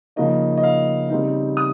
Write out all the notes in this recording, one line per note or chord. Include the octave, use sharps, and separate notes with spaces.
C#3 F3 A#3 D#4 D#5
D#5
F5
C#3 G3 C4 D#4
D#6